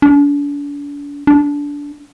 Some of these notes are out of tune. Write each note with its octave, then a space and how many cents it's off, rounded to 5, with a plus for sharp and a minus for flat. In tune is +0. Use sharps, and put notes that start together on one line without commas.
D4 -40
D4 -20